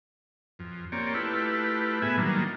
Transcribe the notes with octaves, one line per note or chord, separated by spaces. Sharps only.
F2
A#3 C4 G4 C#5 D5
A3 E4 F4 G4 B4
A2 B3 G#4 B4 E5 G#5
D#3 F#3 G3 A#3 D4 F4